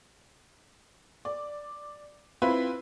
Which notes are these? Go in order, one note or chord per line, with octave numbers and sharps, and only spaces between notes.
D5
C4 E4 F4 B4